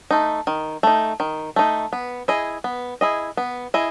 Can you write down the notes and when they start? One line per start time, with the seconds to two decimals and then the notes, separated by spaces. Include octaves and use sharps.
0.11 A3 D#4
0.47 D#3
0.83 A3 D#4
1.20 D#3
1.56 A3 D#4
1.93 B3
2.28 E4 G#4 D#5
2.64 B3
3.01 E4 G#4 D#5
3.37 B3
3.74 E4 G#4 D#5